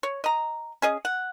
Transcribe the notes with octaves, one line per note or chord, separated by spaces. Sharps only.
C#5
D#5 A#5
C#4 G#4 D#5
F#5